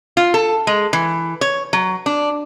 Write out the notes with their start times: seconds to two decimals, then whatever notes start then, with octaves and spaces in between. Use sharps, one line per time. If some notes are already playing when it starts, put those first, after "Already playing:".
0.17 F4
0.34 A4
0.67 G#3
0.93 E3
1.41 C#5
1.73 F#3
2.06 D4